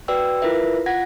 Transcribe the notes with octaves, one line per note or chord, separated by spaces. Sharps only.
F#4 B4 D5 G5 E6
E4 F4 A#4 B4 E5
F4 F#5 G#6 A#6